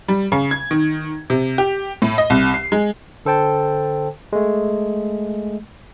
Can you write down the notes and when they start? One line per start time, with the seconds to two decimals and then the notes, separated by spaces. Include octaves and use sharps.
0.08 G3
0.32 C#3
0.51 G#6
0.71 D#3
1.30 C3
1.58 G4
2.02 A2
2.18 D#5
2.30 C2
2.54 C7
2.72 G#3
3.25 D3 A4 C5 G5 A5
4.33 G#3 A3